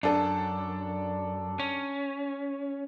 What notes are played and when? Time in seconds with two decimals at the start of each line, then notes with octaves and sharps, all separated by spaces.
0.03 F#2 D4 A4
1.59 C#4